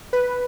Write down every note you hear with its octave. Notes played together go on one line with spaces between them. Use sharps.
B4